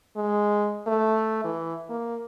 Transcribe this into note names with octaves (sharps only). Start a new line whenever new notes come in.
G#3
A3
E3
A#3